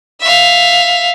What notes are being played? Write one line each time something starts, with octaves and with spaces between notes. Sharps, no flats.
E5 F5